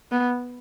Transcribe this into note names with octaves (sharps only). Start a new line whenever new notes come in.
B3